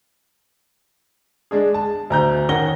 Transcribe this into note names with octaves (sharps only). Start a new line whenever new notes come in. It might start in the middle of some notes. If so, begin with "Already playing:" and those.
G#3 D4 G#4
A5
D2 A#5 G6
D#3 C#4 F#5 A#6 G7